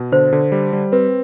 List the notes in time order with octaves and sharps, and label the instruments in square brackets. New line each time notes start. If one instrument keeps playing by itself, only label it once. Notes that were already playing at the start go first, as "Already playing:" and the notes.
Already playing: [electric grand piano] B2
[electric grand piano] D3 [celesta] C5
[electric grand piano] D3
G3
G3
[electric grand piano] C4 [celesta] B4